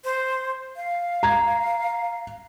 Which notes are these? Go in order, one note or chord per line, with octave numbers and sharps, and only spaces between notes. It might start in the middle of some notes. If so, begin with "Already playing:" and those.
C5
F5
A#5 G#6